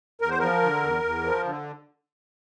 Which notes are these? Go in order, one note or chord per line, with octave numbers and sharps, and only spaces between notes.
E2 A#4
C5
F3 A#4
D3
E2
E2
F3
D3